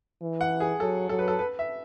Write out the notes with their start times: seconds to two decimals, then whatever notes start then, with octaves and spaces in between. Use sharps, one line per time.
0.22 E3
0.41 F#5
0.60 G#4
0.80 F#3 A4
1.09 F#3 A4
1.19 B4
1.28 A4
1.39 B4
1.59 E5